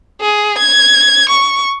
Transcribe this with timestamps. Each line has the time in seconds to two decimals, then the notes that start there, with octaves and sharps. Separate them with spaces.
0.21 G#4
0.58 G#6
1.29 C#6